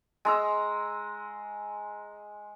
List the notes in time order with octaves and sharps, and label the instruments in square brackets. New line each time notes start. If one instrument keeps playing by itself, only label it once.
[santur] G#3 A#5 E6